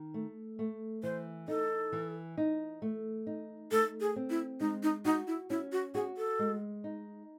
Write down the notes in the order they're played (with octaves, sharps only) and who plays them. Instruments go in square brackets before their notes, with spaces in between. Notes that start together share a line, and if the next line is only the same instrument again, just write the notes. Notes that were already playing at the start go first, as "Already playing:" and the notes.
Already playing: [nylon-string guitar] D#3
A3
A3
[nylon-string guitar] E3 [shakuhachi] C5
[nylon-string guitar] D#4 [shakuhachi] A4
[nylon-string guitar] E3
D#4
A3
D#4
[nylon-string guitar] A3 [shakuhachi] A4
[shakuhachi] G#4
[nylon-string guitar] C4
[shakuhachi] E4
[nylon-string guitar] G#3 [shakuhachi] D#4
[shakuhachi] D#4
[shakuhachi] D#4 [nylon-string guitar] F#4
[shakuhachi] E4
[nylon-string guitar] C#4 [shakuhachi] E4
[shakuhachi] F#4
[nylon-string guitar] F#4 [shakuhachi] G#4
[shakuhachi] A4
[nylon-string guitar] G#3
D#4